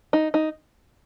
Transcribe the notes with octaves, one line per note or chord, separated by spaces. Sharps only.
D#4
D#4